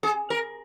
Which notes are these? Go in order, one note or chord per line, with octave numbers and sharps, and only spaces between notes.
G#4
A#4